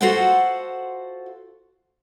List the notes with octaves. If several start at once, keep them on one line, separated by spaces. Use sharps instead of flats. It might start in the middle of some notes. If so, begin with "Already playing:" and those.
F4 F#4 A4 C5 F5 F#5